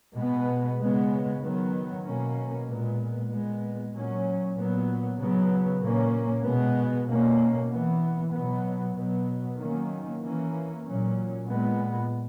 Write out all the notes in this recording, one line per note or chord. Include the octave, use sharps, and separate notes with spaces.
B2 G#3 B3
C#3 G#3 B3
D#3 F#3 B3
B2 A#3 C#4
A#2 G#3 B3
A#2 G#3 B3
A#2 F#3 C#4
A#2 F#3 B3
C#3 F#3 B3
A#2 A#3 C#4
B2 G#3 B3
B2 A#3 C#4
E3 B3
B2 F#3 B3
B2 F#3 B3
D#3 F#3 A#3 C#4
E3 A#3 C#4
A#2 F#3 C#4
A#2 G#3 B3